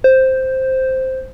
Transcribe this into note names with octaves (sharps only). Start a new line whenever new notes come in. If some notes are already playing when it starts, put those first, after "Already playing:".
C5